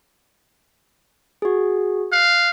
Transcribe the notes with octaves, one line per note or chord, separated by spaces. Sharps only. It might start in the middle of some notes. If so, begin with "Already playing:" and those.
F#4 G#4
F5 F#6